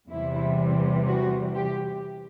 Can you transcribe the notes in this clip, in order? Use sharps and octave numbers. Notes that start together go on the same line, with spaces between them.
E2 C3 E3 G3 E4
F#4
G4